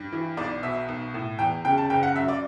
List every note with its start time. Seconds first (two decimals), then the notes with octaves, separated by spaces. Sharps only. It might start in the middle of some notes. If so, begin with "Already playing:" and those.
Already playing: G2
0.12 E3
0.37 B1 D5
0.63 B2 E5
0.89 B1
1.14 A2
1.39 E2 G5
1.65 C#3 G5
1.78 A5
1.90 F#1 G5
2.03 F#5
2.15 F#2 E5
2.28 D5